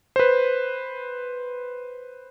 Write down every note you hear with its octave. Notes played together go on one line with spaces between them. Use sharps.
B4 C5